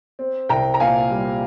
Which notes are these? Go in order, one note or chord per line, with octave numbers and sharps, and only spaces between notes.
C4
C2 G5 A#5
A#5
A#2 F5 G#5
G3